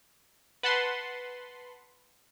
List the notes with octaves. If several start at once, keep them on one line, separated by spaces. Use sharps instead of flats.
B4 F#5 A5 B5 C6